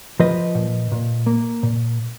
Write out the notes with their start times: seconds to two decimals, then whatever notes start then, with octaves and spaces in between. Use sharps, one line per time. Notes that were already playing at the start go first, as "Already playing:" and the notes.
0.20 F3 B4 D#5
0.55 A#2
0.92 A#2
1.26 A#3
1.63 A#2